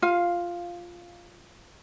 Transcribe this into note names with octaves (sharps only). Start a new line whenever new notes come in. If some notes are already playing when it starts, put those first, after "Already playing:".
F4 F5